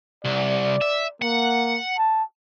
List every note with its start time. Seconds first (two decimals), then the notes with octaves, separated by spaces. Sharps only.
0.25 C2 D5
0.81 E5
1.22 A#3 F#5
1.98 A5